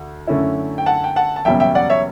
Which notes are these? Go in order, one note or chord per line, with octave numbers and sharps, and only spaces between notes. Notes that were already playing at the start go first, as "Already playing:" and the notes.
Already playing: D2
F#2 D3 A3 C#4 E4
G5
F#5 A5
G5
F#5 A5
A5
F#1 E2 B2 G3 C#4 E5 G5
E5 G5
D5 F#5
C#5 E5